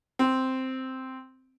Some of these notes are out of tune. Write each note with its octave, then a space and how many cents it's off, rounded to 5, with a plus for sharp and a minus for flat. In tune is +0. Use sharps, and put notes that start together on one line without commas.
C4 -5